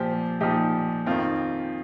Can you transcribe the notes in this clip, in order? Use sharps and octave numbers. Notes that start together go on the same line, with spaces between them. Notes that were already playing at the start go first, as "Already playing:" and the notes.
Already playing: A#2 F3 G4 C5
A#2 F3 D#4 G4
F2 D#3 C4 F4